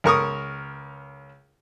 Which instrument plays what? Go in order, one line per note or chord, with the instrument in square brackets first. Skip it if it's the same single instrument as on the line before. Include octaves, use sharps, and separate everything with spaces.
[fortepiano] C#2 A#4 C#6 D#6